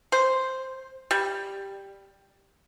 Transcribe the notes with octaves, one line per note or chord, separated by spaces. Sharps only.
C5
G3